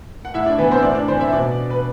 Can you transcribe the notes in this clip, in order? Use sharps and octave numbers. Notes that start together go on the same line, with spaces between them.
F#5
A2 E4 E5
D4 D5
E3 B3 B4
C4 C5
E5
A2 D4 D5
D4 D5
E3 C4 C5
E4 E5
B2 D4 D5
B4